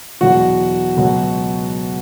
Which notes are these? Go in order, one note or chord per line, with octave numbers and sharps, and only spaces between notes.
E2 B2 F#3 F#4
C#2 B2 F#3